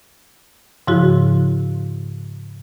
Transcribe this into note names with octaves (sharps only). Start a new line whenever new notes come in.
G#2 C#3 F3 E4 F#4